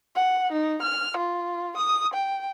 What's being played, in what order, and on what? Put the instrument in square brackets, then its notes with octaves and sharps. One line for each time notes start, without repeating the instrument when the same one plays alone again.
[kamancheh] F#5
D#4
F6
F4
D#6
G5